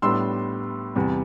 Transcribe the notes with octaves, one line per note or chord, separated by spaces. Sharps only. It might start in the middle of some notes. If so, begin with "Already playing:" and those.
A2 G3 B3 D4 C6 E6
E2 C3 G3